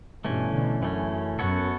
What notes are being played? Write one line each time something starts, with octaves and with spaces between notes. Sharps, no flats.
G2 B2 E3 A3 C#4
B2 D3
F#2 E3 A3 C#4
F#2 B3 F#4 A4 C#5